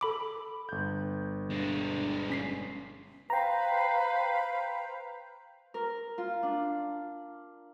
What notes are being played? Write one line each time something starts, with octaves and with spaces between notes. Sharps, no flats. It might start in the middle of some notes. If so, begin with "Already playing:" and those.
A4 B5 D6
G1 G6
G#3 D4
C#4 B6 C7
B4 C5 F5 G5 A#5
A#4
F4
D4